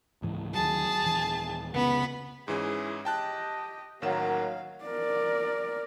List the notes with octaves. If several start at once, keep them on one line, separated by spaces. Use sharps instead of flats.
C#2 G#2 E3
D2 D#3 F#3 G#4 A5
D#1 E3
F1 C#2 C#3 B3 B5
G#2 E3 C#4 E4 G#4
G4 D#5 G5 A5 F#6
A1 D#3 F#3 A#3 F5 E7
A#4 D5